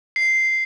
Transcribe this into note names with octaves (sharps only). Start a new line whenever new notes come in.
C7